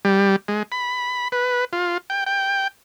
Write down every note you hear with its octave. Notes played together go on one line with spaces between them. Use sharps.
G3
G#3
B5
B4
F4
G5
G5